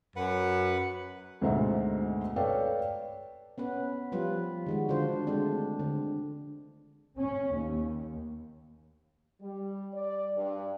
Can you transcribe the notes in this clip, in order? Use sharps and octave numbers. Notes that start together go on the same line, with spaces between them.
F#2 B4 F#5
D2 G#2 B2 C5 E5 A#5
A4 B4 C#5 D5 F5 G5
B3 C#4 B4
F3 G3 F4 B4
D#3 G#3 F#4
D3 D4 F4 C5
G#3 A3 C4 D4
D3
C#4
D#2
G3
D5
G2